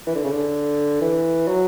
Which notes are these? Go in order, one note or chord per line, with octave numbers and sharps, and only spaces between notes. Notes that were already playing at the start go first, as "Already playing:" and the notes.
E3
D3
C#3
D3
E3
F#3